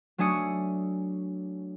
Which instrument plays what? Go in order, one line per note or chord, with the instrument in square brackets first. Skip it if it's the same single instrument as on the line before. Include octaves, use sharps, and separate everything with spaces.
[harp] F#3 A3 D4 G#5 D#6 C#7